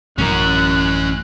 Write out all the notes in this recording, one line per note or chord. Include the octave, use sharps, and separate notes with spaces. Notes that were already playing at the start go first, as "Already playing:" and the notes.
A1 F#2 C#4 A#4 F#6